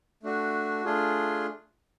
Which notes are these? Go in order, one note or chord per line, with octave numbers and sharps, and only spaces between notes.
A3 D4 F#4
A3 D4 F4 G#4